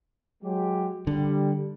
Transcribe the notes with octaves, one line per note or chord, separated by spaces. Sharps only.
F#3 G#3 G4
D3 G3